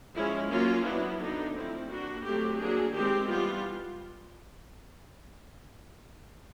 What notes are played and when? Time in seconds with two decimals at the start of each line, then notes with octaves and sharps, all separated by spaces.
0.13 F3 G#3 C#4 E4
0.48 F#3 A#3 C#4 F4
0.84 F#3 B3 D4 E4
1.18 D3 F#3 B3 D4 D#4
1.54 F3 A3 C4 E4
1.88 G3 A#3 D4 F#4
2.23 F#3 A3 C4 G4
2.58 F#3 A#3 D4 G#4
2.93 D#3 G#3 C4 G4
3.28 E3 G3 B3 F4